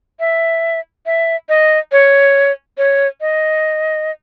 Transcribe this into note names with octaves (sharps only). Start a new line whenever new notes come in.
E5
E5
D#5
C#5
C#5
D#5